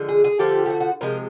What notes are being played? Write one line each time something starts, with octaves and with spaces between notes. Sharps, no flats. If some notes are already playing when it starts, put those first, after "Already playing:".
Already playing: D3 F3 G#3
G#4
G#4
D3 F3 A3 G4
G4
F#4
F#4
C3 F3 G#3 A#4